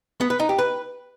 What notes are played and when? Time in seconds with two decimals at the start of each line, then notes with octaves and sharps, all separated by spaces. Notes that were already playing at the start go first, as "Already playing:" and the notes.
0.21 B3
0.30 B4
0.40 D#4
0.49 G4
0.58 B4